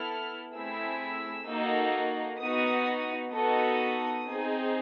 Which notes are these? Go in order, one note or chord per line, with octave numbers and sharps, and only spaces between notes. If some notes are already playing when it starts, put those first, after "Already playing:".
Already playing: B3 E4 A4 F6
A3 C4 E4 G#4 E6
A#3 D#4 F#4 A4
B3 D#4 F#4 D#6
B3 D#4 F#4 A4 D#6
C4 D#4 G#4